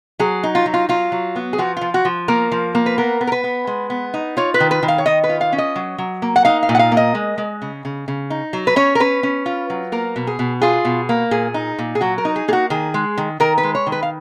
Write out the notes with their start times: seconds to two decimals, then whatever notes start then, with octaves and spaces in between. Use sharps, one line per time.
0.19 F#3 G#4
0.43 D#4
0.55 F4
0.66 F#3
0.74 F4
0.89 F#3 F4
1.12 F#3
1.36 B3
1.53 G#4
1.58 F3 F#4
1.77 F3 F4
1.94 F#4
2.05 F3
2.28 A#3 A#4
2.52 F3
2.75 A#3
2.86 B4
2.98 B3 A#4
3.21 B3
3.27 A#4
3.32 B4
3.44 B3
3.67 G#3
3.90 B3
4.14 D#4
4.37 F4 C#5
4.54 B4
4.60 D#3
4.71 B4
4.83 D#3
4.88 F5
4.98 C#5
5.06 D#3 D#5
5.24 B4
5.29 F4
5.41 F5
5.52 C#4
5.58 D#5
5.76 F#3
5.98 F#3
6.22 A#3
6.36 F#5
6.45 D#4 F5
6.63 F5
6.69 A#2
6.75 F#5
6.79 F5
6.92 A#3
6.97 D#5
7.15 G#3
7.38 G#3
7.62 C#3
7.85 C#3
8.08 C#3
8.30 D#4
8.53 F#3
8.67 B4
8.76 C#4 C#5
8.95 A#4
9.00 C#4 B4
9.23 C#4
9.46 F4
9.70 F#3
9.92 A#3 A#4
10.16 B2
10.27 G#4
10.39 B2
10.62 F4 G#4
10.85 B2
11.09 A#3
11.31 A#2 G#4
11.54 D#4
11.79 A#2
11.95 G#4
12.01 F#3 F#4
12.18 A#4
12.25 D#4
12.36 G#4
12.48 A#3 G#4
12.53 F#4
12.70 D#3 G#4
12.94 G#3
13.18 D#3
13.40 D#3 A#4
13.58 B4
13.63 G#3
13.75 C#5
13.87 D#3
13.92 B4
14.03 F5